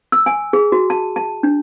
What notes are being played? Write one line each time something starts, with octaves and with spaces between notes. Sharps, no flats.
E6
G#5
G#4
F#4
A5
A5
D4